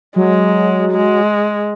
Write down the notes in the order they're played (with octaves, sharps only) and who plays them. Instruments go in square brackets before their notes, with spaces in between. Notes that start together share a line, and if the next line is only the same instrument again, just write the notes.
[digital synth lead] F#3 [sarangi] G#3
[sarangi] G#3